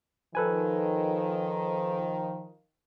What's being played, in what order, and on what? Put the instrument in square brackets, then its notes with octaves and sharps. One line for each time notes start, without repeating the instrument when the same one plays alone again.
[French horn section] D#3 F3 [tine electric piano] A4 B4 G#5